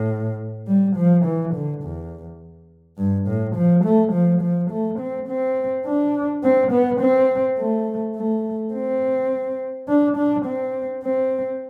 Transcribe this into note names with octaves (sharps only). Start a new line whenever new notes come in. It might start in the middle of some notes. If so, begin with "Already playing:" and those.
Already playing: A2
G3
F3
E3
D3
E2
G2
A2
F3
A3
F3
F3
A3
C4
C4
D4
C4
B3
C4
A3
A3
C4
D4
D4
C4
C4